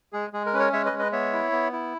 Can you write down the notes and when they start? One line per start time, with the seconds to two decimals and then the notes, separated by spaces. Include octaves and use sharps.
0.13 G#3 G#4
0.33 G#3 G#4
0.46 A#4
0.53 C#4 B4
0.59 A#4 C#5
0.73 G#3 C#5 E5
0.86 B4 D#5
0.92 G#3
0.99 B4 D#5
1.12 B3 C#5 E5
1.33 E4
1.52 B3
1.72 E4